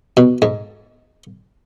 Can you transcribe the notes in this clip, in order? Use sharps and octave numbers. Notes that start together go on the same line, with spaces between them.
B2
G#2